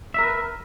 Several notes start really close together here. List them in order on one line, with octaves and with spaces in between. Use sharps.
E5 A#4 B4